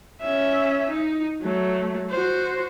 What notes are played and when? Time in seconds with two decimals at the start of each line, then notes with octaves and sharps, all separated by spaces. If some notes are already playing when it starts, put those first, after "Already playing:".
0.22 C#4 E5
0.90 D#4
1.42 F#3 A3
2.11 F#4 C5